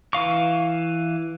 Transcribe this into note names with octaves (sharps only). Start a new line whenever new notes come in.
E3 F5 C#6